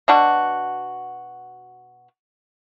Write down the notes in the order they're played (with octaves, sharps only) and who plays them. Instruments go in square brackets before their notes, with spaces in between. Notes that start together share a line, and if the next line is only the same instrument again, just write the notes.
[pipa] B2 D4 F#4